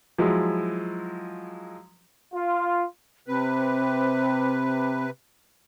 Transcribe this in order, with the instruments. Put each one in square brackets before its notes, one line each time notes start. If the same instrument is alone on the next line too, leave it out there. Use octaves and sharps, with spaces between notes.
[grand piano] F3 F#3 G#3 E4
[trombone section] F4
[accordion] C3 B4 [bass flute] C4